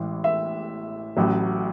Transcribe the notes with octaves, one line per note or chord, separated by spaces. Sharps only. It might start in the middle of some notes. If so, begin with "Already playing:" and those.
Already playing: A1 A2 E3 G#3
E5
A1 A2 F#3